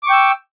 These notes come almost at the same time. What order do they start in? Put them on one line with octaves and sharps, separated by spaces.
D6 C#6 G5 E6